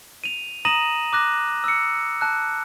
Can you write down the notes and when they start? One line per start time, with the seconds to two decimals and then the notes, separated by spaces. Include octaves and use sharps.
0.24 D#7 F7
0.65 A#5 D#6 A#6 D#7 E7 F#7
1.13 D6 F#6 A#6
1.64 E6 C#7
2.21 A5 F#6